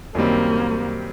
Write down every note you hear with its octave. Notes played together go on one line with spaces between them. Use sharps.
F#2 D#3 G3 A#3 C4